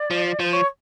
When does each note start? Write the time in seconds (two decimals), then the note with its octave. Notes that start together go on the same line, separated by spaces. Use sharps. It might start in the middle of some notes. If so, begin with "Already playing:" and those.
Already playing: D5
0.11 F3
0.39 F3 C5
0.53 C#5